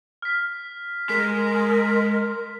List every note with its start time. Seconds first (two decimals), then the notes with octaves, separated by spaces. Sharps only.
0.22 F6 B6
1.09 G#3 A#4 B6